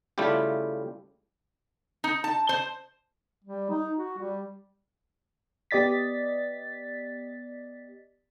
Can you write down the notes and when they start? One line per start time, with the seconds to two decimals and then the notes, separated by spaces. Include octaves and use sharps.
0.18 C#3 G3 A3 E4 F4 G4
2.04 D#4
2.24 A5
2.49 C5
3.44 G3
3.70 D#4
3.96 F#4
4.18 G3
5.71 B3 G4 D5 D#5 A6 B6